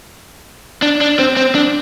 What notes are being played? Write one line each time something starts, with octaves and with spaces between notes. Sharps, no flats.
D4
D4
C4
C4
D4